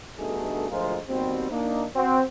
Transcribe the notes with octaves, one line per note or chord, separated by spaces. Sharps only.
G2 B2 D3 A3 D#4 G#4
D2 F3 G#3 F4 A#4 C5
D#2 B2 G3 C4
A#3 D4 D#4
C4 F#4